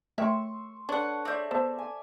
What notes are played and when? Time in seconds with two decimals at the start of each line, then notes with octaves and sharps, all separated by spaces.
0.18 A3 A#4 C#5 E5 G5 C6 C#6 E6
0.89 D4 A4 B4 C#5 F#5
1.25 C4 G#4 D5 E5 G6
1.51 B3 C5 E5 A5
1.79 G#5